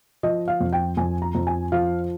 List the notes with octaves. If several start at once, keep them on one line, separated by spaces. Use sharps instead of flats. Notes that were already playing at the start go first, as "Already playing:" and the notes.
F3 D#5
F5
F2
G5
F2 G#5
A#5
F2
G#5
F3 F5